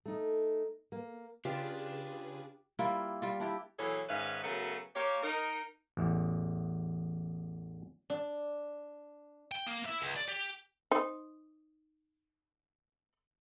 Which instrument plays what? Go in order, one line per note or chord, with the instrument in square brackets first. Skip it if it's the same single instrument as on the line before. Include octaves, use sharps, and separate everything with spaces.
[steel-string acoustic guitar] A3 D#4
A#3
[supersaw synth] C#3 G#4 B4 [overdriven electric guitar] D4 D5 [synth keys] F4 [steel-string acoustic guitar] G4
[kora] G3 A#3 E4 F4
G3 F4
D4 E4 G4
[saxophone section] A#2 E3 F#3 G#4 A4 C#5
G#2 D#3 C#4 B4 E5 F5
C#3 F#3 A3 B3 F#4 A#4
A#3 G4 C#5
D#4 A#4
[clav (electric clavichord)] A1 E2
[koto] D4
[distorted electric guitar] G5
A#3
E4 E5
C#2
D5
G4
[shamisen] D#4 C5